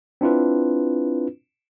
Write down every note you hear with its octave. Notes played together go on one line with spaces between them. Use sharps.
C4 D4 E4 F4 B4